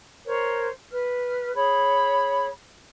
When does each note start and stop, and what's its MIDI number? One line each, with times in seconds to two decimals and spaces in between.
0.25 0.68 70
0.25 0.68 72
0.25 0.68 73
0.90 1.52 71
0.90 1.52 89
1.54 2.48 68
1.54 2.48 73
1.54 2.48 83